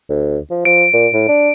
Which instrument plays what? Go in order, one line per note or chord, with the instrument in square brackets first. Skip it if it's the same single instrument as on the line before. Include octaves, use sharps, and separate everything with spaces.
[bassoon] D2
F3
[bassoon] F3 [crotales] D7
[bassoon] A#2
A2
D4